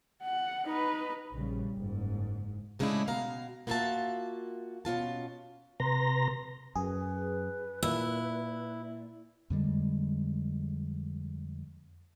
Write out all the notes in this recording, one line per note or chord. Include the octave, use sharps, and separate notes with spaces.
F#5
D#4 B4
A#1 C#3 G3
F#1 G#2
A2 C#3 G#3 A3 D4 E4
B2 F5 A#5
A#3 B3 F4 F#4 E5 A5
B2 C#4 F4 A5
C3 B4 A#5 C6 A#6
F#2 G#4 B4
A#2 E4 E5
F2 D3 G3 G#3